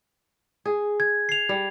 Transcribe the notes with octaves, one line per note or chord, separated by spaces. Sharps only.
G#4
G#6
C7 F7
G3